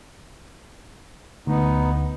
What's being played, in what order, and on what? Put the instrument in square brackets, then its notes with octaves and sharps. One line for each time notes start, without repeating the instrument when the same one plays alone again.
[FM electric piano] D2 [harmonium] B3 D#4